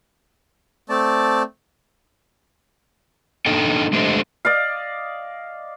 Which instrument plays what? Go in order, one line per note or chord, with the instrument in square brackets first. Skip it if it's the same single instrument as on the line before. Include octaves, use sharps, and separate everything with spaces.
[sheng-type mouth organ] A3 C4 D5 A5
[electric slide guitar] A#3 D4 D#4 A4 G5
G#3 A3 D4 G4 C5 D#5
[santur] D5 D#5 F5